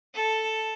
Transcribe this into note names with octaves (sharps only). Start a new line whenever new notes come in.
A4